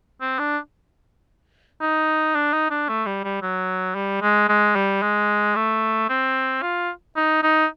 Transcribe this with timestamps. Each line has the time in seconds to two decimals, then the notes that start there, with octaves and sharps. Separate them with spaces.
0.21 C4
0.39 D4
1.81 D#4
2.35 D4
2.53 D#4
2.71 D4
2.89 A3
3.06 G3
3.24 G3
3.42 F#3
3.95 G3
4.22 G#3
4.49 G#3
4.76 G3
5.02 G#3
5.56 A3
6.09 C4
6.62 F4
7.16 D#4
7.43 D#4